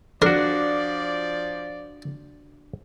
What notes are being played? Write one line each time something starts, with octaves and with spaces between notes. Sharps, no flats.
F3 D4 F#4 A#4 D5